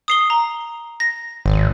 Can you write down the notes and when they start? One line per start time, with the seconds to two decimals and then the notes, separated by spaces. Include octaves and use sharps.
0.08 D#6 C7 G7
0.30 A#5
1.00 A#6
1.46 G#1